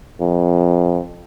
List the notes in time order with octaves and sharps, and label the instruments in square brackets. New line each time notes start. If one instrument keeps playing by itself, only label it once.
[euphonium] F2